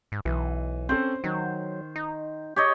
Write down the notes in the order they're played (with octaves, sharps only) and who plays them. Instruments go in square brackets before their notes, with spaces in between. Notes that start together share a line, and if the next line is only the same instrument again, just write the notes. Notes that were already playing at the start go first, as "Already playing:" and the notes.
[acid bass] G#2
[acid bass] B1 [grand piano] E3
[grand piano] C4 C#4 A4 [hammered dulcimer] C5
[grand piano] D#3 [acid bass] F#3
[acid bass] D#4
[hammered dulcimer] G4 C#5 D#5